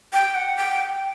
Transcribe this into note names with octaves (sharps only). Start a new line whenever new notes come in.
G5
F#5
G5